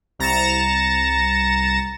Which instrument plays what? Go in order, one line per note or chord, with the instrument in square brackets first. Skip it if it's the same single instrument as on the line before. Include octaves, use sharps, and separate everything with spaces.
[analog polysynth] C2 A#5 A6 A#6 C#7 E7